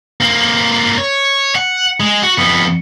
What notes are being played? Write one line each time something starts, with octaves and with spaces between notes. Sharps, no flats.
A#3 C4
C#5
F#5
G#3
F#4
F2 B3